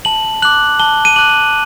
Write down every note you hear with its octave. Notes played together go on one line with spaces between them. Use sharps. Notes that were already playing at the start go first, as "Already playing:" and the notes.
A5 F#7
D6 F#6 F#7
A5 G7
D#7
D6 F#6 F#7